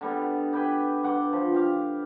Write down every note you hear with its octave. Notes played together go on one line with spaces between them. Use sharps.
D3 G3 B3
G4 B4 G5 G#5
G2 F#5 G5 D6
F3
G4 F5